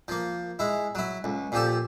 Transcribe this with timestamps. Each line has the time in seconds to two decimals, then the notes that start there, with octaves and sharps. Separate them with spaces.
0.08 F3 A#3
0.59 G#3 E4
0.95 F#3 E4
1.24 C#2
1.52 A#2 F3 G4 A4